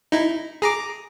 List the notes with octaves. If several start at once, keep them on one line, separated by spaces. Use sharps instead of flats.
D#4 E4
G#4 A#5 D6